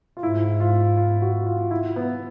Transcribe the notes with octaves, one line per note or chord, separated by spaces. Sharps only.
F4
G#2 E4
F4
F4
F#4
F4
E4
B3